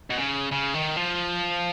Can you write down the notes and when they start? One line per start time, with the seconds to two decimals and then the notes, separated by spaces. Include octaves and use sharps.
0.10 B2
0.17 C#3
0.51 C#3
0.74 D#3
0.96 F3